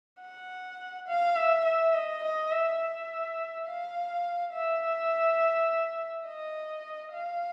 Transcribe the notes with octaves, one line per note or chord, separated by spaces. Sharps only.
F#5
F5
E5
E5
D#5
D#5
E5
E5
F5
E5
D#5
F5